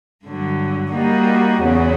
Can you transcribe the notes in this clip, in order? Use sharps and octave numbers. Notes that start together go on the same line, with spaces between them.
G2 D3 F#3
G3 A#3 D#4 F#4
E2 C#3 F#3 B3